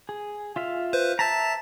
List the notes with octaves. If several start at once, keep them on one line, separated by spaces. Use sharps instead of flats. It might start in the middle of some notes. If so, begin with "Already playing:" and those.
G#4
F4 E5 F5
B4 C5
E5 A5 A#5 A6 B6